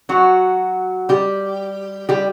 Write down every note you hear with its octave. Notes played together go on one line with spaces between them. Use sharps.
F#3 F#4
G3 G4
G3 G4